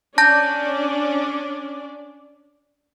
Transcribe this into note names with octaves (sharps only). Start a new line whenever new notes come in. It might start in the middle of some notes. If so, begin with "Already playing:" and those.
C#4 D4 D5 A5 G6 A#6